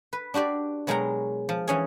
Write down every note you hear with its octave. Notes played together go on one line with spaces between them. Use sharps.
B4
D4 F#4 G4 D5
B2 F#3 G#3 A#4 G5 A#5
F3
E3 C#4 G#4